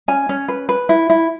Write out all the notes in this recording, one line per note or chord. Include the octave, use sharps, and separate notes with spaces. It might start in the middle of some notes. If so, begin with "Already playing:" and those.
C#4 G#5
C#4
B4
B4
E4
E4